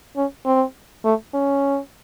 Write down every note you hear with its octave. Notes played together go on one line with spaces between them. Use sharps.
C#4
C4
A3
C#4